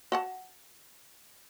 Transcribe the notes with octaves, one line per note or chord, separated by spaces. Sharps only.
F#4 F#5 A5